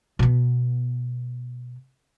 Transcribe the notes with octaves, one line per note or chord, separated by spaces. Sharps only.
B2 B3